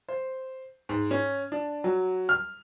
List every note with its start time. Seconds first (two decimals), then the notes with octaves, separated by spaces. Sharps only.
0.08 C5
0.89 G#2
1.11 C#4
1.52 D4
1.84 F#3
2.29 F6